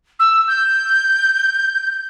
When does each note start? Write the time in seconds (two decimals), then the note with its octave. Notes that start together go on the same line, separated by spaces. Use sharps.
0.19 E6
0.48 G6